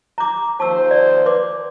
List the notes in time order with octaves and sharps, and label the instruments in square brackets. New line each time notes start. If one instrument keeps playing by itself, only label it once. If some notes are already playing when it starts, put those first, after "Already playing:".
[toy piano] A#5 D6
[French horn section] D#2 F3 C5 [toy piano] A5 C#6 E6
[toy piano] D5
B4 C6 D6